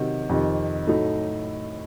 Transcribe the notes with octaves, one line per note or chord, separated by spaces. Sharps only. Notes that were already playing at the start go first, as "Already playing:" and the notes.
Already playing: C3 D#3 F#3
F2 C3 D#3
A2 F#3 A3 D#4